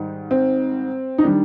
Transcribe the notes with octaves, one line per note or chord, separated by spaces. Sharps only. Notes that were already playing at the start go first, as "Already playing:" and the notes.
Already playing: G#2 D#3 G3
C4
D#4
D#3 G3 D4